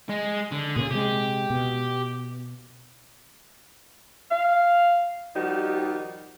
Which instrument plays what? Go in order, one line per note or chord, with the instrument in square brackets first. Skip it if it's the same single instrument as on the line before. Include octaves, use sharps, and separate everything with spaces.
[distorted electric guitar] G#3
D3
[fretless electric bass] A#2 C#3 [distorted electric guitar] G#4
[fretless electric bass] C3 G#3 [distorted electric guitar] G4
[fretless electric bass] B2
[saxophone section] F5
D#3 F3 G3 D#4 F#4 G4